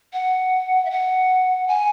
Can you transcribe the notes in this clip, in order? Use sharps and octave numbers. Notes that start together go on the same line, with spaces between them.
F#5
E5
F#5
G#5